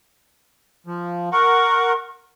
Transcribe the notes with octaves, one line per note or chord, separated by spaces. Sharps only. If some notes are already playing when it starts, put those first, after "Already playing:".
F3
A#4 F#5 C#6